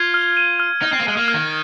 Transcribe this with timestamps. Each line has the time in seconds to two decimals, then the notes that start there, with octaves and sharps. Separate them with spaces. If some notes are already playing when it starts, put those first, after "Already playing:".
Already playing: F4 G#6
0.14 F6
0.37 D#7
0.60 F6
0.82 D#4 F6
0.93 C4
1.00 A#3
1.05 G#3 D#7
1.17 A#3
1.28 F6
1.34 D#3